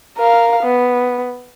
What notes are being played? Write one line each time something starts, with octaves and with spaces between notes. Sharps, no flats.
A#4 F5
B3